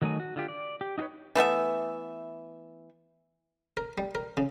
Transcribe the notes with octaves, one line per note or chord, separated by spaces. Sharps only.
D#3 F#3 A3 D#4 G#5
F#4
D3 F4 G4
D5
G4
D#4 F#4 G#4 B4 C#5
E3 A3 B3 E5
A#4
G3
A#4
C#3